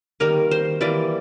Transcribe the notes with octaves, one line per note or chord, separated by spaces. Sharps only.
D#3 G3 A#3 A#4
C5
E3 G3 A#3 D5